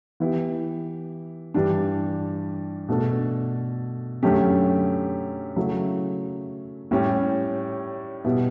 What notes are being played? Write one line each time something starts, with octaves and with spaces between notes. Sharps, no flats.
E3 B3 E4 G4
G2 E3 G3 D4
B2 A3 D4 A4
F#2 D3 A3 C#4 G4
C#3 F#3 A3 E4
A2 G3 C#4 G4
B2 G3 B3 E4